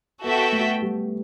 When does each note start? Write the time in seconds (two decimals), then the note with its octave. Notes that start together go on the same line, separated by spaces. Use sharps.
0.24 B3 F#4 A4 E5 G5
0.52 A3
0.82 G3